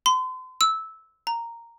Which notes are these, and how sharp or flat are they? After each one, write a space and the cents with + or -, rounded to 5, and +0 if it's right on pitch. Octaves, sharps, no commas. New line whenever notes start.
C6 -40
E6 -15
A#5 -5